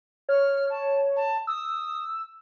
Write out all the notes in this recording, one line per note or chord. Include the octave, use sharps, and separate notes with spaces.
C#5 F6
A5
A5
D#6 E6